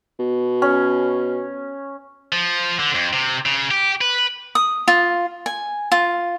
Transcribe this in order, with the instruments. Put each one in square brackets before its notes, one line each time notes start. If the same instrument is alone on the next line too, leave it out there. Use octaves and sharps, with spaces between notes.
[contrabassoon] B2
[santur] C#4
[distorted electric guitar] F3
D3
F2
C3
C#3
G4
B4
[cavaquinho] D#6
F4
G#5
F4